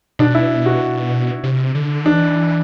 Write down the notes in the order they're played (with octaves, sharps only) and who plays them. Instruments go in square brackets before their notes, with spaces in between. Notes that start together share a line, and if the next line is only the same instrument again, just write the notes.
[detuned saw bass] B2 [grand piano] D4
[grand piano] E4
F#4
[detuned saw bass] C3
D3
[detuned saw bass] E3 [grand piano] D4